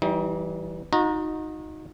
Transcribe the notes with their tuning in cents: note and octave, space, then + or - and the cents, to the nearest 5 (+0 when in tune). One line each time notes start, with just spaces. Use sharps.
E3 +0 G3 -25 D#4 +30
D#4 +0 F#4 -40 A#5 +5